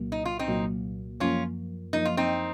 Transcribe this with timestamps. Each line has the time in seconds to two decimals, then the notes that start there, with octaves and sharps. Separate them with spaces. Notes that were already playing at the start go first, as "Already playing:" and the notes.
Already playing: C2 A#2 F#3 A#3
0.12 D#4
0.25 F4
0.39 C4 D#4
0.48 C2 A#2 F#3 A#3
1.20 F#2 F3 A#3 C#4 F4
1.93 F#2 F3 A#3 D#4
2.05 F4
2.17 C4 D#4